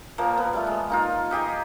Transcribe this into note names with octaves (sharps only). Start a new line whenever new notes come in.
A#2 F3 A#3
B3
G3 A3 F4
G#3
A#3 D#4 F4
D#4 G4 G#4 D#5